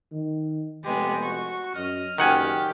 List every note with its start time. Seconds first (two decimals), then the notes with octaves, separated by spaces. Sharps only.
0.12 D#3
0.84 F1 G#3 B3 G4
1.23 F#4 C#6
1.75 F#2 D#5 F6
2.18 F#1 D#3 G4 F#5 G#5